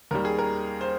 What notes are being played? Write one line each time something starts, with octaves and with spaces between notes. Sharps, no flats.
D#2 D#3 G3 A#4
G#4
A#4
C5